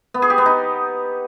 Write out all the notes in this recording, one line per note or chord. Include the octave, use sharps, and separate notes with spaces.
B3
G#4
G4
B3
D#4